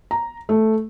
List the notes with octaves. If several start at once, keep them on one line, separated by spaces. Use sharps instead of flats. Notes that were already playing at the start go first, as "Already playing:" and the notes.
A#5
A3